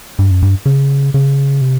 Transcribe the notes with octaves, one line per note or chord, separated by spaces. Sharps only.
G2
F#2
G2
C#3
C#3
C3